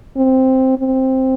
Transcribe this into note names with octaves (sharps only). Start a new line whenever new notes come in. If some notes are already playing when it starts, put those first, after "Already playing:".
C4
C4